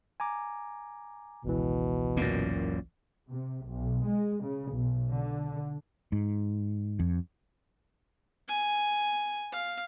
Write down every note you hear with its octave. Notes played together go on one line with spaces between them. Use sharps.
G#5 A#5 D6
G#1 C#2 B2 E3
F#2 A#2
C3
B1
G#3
C#3
B1
D3
G#2
F2
G#5
F5